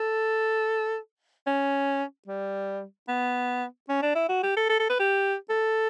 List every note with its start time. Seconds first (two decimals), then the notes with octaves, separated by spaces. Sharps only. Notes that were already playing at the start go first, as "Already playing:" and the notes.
Already playing: A4
1.47 C#4
2.27 G3
3.08 B3
3.89 C#4
4.02 D4
4.15 E4
4.29 F#4
4.43 G4
4.57 A4
4.69 A4
4.80 A4
4.90 B4
5.00 G4
5.50 A4